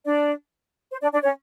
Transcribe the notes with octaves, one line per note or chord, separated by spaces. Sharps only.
D4 D5
C5
D4 D5
D4 D5
C#4 C#5